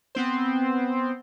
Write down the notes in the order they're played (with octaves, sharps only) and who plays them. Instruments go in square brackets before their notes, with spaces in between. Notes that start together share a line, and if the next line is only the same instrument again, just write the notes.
[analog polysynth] B3 C4 C5